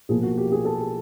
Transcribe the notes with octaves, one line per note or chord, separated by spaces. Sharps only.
B1 A#2 F3 A#3 G#4
F#4
G4
G#4
A4